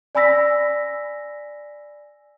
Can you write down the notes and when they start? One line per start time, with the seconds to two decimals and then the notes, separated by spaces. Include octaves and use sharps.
0.15 D5 G#5 B5 E6 A#6 B6